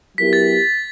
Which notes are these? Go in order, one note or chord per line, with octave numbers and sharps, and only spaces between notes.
F#3 B3 E4 G4 A#4 B6
A6